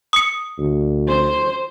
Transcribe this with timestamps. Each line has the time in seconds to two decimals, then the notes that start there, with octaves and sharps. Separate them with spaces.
0.13 D#6 C#7
0.58 D2
1.07 C5